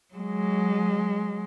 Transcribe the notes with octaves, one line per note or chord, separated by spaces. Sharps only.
F#3 G#3